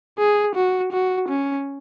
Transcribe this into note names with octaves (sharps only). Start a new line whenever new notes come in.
G#4
F#4
F#4
C#4